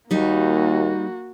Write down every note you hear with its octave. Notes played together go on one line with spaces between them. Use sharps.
D#2 G3 A#3 D#4 F#4